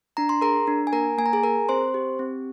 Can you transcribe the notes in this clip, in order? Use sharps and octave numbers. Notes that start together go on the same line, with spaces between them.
D4 A#5
C6
G#4 A#4 A#5
D4
G#5
A#3 A#4 A#5
A#3 G#5
A#5
G#4 G#5
G#4 A#4 A#5
C4 C5 C6
G4
C4